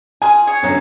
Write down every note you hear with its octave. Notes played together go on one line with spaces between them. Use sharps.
F4 G#4 G#5
G#4 C#5
G1 F#3 C#4